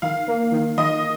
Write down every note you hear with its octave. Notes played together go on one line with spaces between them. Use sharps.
D#3 F5
A#3
D#3
D#3 D#5